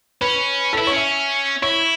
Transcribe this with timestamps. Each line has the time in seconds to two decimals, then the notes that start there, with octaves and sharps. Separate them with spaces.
0.21 C#4 B4
0.73 A4
0.78 E4 B4
0.87 C#5
0.91 C#4 E5
1.62 E4 C#5